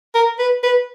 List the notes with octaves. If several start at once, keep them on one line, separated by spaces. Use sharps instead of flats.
A#4
B4
B4